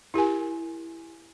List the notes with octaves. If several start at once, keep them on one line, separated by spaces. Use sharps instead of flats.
E4 G4 A#4 G#5